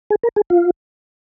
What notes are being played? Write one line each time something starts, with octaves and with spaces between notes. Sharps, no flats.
G#4
A#4
G#4
F4